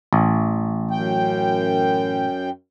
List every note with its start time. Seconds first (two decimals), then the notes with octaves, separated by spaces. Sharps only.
0.13 A1
0.91 F#2 G5